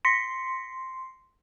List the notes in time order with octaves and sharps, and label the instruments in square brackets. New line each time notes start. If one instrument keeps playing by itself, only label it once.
[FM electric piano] C6 [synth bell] A#6 B6 C#7